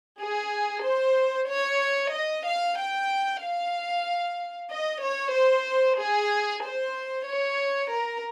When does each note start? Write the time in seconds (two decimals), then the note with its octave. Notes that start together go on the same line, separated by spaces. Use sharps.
0.20 G#4
0.83 C5
1.49 C#5
2.13 D#5
2.45 F5
2.77 G5
3.41 F5
4.70 D#5
5.02 C#5
5.34 C5
5.99 G#4
6.64 C5
7.28 C#5
7.93 A#4